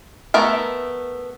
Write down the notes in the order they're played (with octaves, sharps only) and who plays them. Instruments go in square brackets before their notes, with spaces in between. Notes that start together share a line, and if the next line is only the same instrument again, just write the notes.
[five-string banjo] A3 B3 A#4 E5